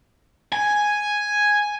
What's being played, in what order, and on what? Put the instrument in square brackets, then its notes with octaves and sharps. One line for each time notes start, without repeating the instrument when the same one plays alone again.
[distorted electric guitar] G#5